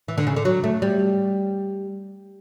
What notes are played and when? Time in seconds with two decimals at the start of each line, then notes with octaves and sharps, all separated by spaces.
0.08 E3
0.18 D3
0.27 C#3
0.36 D3
0.45 F#3
0.64 A3
0.82 G3